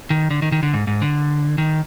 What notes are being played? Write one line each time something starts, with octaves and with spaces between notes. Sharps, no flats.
D#3
D3
D#3
D#3
D3
G#2
G#2
D3
D#3